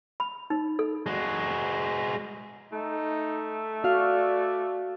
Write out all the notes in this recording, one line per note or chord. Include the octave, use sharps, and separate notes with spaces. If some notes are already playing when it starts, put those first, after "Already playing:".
B5
D#4
A4
G#3 F#4
A3 D#4
F#4 D5 F5